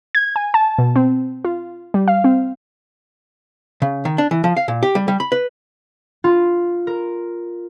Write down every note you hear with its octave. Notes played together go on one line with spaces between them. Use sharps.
G#6
G#5
A5
B2
C4
F4
G3
F5
C4
C#3
D#3
D4
E3
F3
F5
A#2
G4
G3
G3
B5
B4
F4
A#4